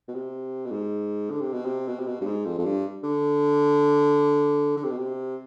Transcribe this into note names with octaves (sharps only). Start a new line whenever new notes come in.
B2
C3
B2
G#2
D3
C3
B2
C3
B2
C3
B2
G2
G#2
F2
F2
G2
D3
D3
C3
B2
C3